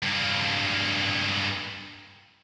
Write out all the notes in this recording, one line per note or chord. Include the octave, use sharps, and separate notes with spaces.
G2 A#3